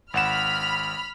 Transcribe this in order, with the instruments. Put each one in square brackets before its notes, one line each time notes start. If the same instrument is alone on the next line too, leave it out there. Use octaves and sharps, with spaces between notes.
[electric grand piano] G#1 F#5 E7 [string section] B5 F6